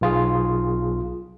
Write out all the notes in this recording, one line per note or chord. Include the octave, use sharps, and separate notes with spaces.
B1 F4 G#4